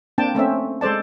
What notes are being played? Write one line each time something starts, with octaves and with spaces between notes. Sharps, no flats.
A#3 C4 D4 G5 A5
A3 C4 C#4 E5
G#3 A4 C5 D5 A5